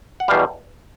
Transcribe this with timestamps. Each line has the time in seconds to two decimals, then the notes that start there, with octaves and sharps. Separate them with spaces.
0.20 F#5
0.28 E2 B2 G3 F5